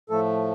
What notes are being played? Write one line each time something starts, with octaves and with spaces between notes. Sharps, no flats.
A2 F3 A3 A4